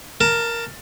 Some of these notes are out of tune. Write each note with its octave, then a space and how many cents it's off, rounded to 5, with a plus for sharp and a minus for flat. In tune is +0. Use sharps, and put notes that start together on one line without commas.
A#4 +0 A5 +20